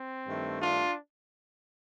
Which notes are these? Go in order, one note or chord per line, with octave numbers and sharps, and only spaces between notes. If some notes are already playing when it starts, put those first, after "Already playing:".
Already playing: C4
G2 D#3 A3
D4 F4